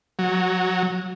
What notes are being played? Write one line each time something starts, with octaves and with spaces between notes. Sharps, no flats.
F#3